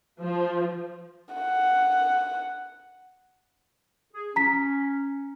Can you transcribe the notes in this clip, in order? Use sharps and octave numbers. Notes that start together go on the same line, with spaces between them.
F3
F#5
G#4
C#4 A#5 B6